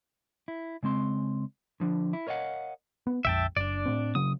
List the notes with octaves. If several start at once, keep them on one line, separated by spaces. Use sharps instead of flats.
E4
C#3 G#3 C4 C6
D3 F3 D4
E4
A#4 C#5 D#5 F5 F#5
B3
A#1 F2 E5 G5 A5
F#1 D4 D5
A2 C4
C#3 F#3 D#6